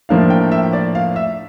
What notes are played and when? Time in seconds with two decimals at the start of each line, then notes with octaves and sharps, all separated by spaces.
0.09 A2 F3 A#3 D4 F5
0.30 G5
0.52 E5
0.73 D5
0.95 F5
1.16 E5